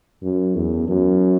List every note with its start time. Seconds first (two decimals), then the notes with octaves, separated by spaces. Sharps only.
0.23 F#2
0.55 E2
0.89 F#2